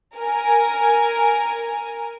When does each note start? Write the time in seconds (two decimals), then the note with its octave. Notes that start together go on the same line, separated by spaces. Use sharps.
0.17 A#4 G#5